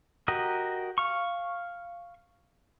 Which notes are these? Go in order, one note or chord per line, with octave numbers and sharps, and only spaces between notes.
F#4 G4 A#4 D#5
F5 C#6